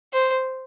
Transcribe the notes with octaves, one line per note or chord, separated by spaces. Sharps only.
C5